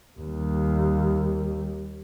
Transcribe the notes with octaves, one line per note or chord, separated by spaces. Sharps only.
D#2 G3